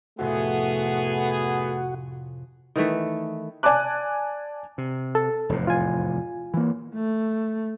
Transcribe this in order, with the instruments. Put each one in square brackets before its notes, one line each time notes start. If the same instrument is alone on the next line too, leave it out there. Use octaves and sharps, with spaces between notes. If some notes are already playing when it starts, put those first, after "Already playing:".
[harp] F2 A2 C3 [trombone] A3 [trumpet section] B3 G#4 [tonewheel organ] F#4
[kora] D#3 E3 A3
[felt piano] D5 G#5 A5 D6 F#6
[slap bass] C3
[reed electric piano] A4
[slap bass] F1 E2 A2
[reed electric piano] F4 G#5
[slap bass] E3 A#3
[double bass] A3